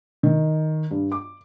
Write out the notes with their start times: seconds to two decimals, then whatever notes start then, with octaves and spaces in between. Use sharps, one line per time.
0.23 D#3
0.91 G2
1.12 D6